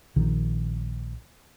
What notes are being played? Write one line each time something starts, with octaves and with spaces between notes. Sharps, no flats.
A#1 D#3